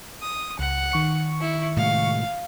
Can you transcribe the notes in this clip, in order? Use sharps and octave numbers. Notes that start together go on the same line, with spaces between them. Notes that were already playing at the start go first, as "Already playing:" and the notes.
D#6
C#2 F#5
D#3 C#6 C#7
E4
A2 C3 G#3 F5